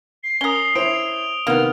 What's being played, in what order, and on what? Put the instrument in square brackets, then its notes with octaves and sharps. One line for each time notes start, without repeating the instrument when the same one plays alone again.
[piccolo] C7
[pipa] C#4 A#4 [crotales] D#6 G7
[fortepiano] E4 C5 C#5 [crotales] D7 F7
[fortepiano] C3 D#3 B3 [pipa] A#3 F#5 [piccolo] F6